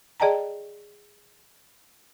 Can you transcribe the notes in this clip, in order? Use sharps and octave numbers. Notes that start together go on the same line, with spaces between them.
G#4 D5 D#5 G5 A5 A#5